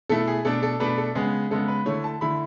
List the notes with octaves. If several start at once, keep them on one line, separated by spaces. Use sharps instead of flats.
B2 A3 E4 A4
G#4
B2 A3 D4 A4
A4
B2 A3 D4 B4
A4
C#3 G#3 B3 G#4
C#3 G#3 B3 A4
B4
D3 A3 E4 C#5
A5
D3 A3 E4 B5